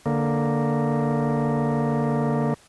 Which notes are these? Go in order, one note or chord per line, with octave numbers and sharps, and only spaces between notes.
D3 A#3